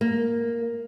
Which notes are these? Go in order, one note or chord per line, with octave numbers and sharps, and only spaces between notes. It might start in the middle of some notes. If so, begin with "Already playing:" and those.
A#3